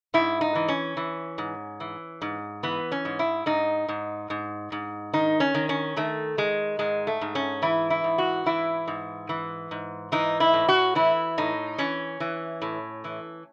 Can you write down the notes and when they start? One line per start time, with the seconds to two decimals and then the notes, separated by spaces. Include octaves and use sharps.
0.14 G#2 E4
0.41 D#4
0.55 E3
0.68 C#4
0.97 E3
1.38 G#2
1.80 E3
2.22 G#2
2.63 E3 B3
2.92 C#4
3.05 G#2
3.19 E4
3.46 G#2 D#4
3.89 G#2
4.30 G#2
4.72 G#2
5.14 D#3 D#4
5.40 C#4
5.54 D#3
5.69 C#4
5.96 D#3 A3
6.37 D#3 G#3
6.79 G#2 G#3
7.07 A3
7.21 G#2
7.35 C#4
7.62 E3 E4
7.90 E4
8.04 G#2
8.18 F#4
8.46 E3 E4
8.87 G#2
9.29 E3
9.71 G#2
10.12 E3 D#4
10.40 E4
10.54 A2
10.69 F#4
10.95 E3 E4
11.38 A2 D#4
11.78 E3 C#4
12.20 E3
12.62 A2
13.04 E3